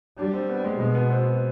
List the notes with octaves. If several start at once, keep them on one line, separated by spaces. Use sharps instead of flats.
G3 D4
C4
B3
G#3
B2 G#3
B3
C4